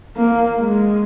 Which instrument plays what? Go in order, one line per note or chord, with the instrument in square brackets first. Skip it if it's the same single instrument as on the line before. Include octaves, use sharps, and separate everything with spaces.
[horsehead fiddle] A#3
G#3